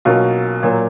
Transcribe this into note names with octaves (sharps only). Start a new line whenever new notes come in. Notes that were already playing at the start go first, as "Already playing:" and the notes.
B1 B2 A#3 C#4 F4
A#2 F#3 A#3